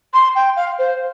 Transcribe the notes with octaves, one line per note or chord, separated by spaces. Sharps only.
C6
G5
F5
C5